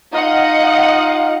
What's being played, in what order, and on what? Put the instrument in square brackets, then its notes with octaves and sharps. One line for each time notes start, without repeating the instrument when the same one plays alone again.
[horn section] D#4 F4 F5 [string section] D#5 F#5